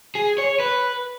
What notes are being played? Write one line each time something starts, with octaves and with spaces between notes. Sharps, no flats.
G#4
C#5
B4